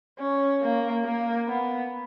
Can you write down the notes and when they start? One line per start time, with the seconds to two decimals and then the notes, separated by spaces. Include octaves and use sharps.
0.19 C#4
0.61 A#3
1.04 A#3
1.47 B3